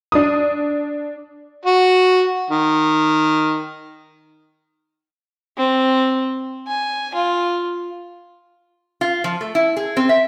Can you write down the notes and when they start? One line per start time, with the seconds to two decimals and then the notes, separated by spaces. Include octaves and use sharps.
0.12 D4 D#6
1.66 F#4
2.51 D#3
5.57 C4
6.67 G#5
7.14 F4
9.01 F4
9.24 F3
9.41 A3
9.55 E4
9.77 G#4
9.97 C4
10.09 E5